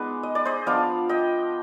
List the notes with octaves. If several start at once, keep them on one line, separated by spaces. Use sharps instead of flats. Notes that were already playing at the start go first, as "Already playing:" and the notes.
Already playing: G#3 B3 D#4 B4 D5
D#5
D5
C5 D#5
F3 B3 D4 F4 D5 F5
D#5 G5